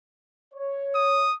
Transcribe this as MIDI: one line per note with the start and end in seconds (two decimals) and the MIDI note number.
0.54 1.26 73
0.95 1.35 87